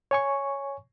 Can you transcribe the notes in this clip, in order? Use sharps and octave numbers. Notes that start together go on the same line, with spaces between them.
C#5 G#5 C#6